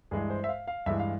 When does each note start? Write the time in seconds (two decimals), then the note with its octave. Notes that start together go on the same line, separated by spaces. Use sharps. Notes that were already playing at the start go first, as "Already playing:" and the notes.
0.11 G2 E3 G#3 G#4
0.30 C5
0.44 E5
0.49 F5
0.67 F5
0.86 G2 E3 G#3 E5
0.99 F5